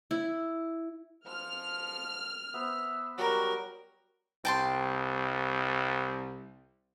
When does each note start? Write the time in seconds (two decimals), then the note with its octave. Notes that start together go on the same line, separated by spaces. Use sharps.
0.11 E4
1.27 F3 F6
2.54 B3 C5 E5
3.18 F#3 G3 F#4 A#4
4.45 C2 G5 A5 C6